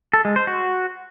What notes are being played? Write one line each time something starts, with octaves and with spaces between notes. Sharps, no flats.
A4
G#3
C5
F#4